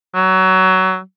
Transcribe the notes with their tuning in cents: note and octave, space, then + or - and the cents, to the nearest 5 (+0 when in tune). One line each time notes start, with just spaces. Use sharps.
F#3 +20